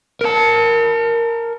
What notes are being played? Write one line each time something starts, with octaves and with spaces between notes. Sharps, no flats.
A#4 A5